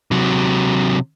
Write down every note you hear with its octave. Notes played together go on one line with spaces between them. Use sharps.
C3 F#3